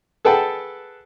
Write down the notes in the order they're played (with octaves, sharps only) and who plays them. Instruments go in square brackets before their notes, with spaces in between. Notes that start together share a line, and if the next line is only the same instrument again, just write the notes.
[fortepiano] G#4 A4 B4 F#5 G5 A5